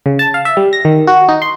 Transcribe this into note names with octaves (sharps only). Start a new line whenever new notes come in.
C#3
A5
F5
E5
G3
A#6
D#3
F#4
D#4
C6